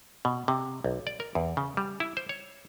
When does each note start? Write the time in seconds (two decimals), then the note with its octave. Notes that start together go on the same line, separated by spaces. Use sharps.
0.25 B2
0.48 C3
0.84 B1
1.07 D5
1.20 A#4
1.35 E2
1.57 C#3
1.77 G3
2.00 E4
2.17 C5
2.29 C#5